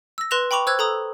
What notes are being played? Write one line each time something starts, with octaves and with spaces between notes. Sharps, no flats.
E6 A#6
B4 C6 F#6 A#6 E7 F7
G5 B5 C#6 D6 F7
C5 E6 F#6 G#6
A4 A#5 D#6